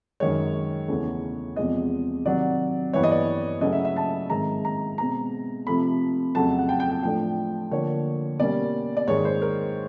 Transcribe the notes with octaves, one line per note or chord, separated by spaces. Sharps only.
F#2 D#3 G#3 C#5
E2 C#3 E3 A3
E2 C3 F3 G#3 D#5
C3 D#3 F#3 D5
G2 E3 G3 B3 C#5
D#5
D5
C#3 F#3 A3 C#4 D#5
E5
E5
A5
G#2 D#3 G#3 C4 A#5
A#5
B2 G#3 C4 A#5
C3 F3 A3 B5
F2 C#3 F#3 A3 A5
F#5
G5
G5
G5
A2 F3 A3 D4 G5
D3 F3 A#3 D4 C#5
B2 G3 A#3 C#4 D5
D5
G#2 D#3 G#3 C#5
C5
A#4